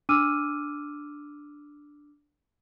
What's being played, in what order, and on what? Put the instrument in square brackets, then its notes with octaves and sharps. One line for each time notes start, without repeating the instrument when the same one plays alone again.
[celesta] D4 D6 E6 F6 D#7